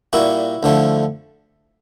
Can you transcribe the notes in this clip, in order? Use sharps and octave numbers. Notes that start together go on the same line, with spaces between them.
A#2 G3 A#3 E4 F#4
D2 D3 F3 A3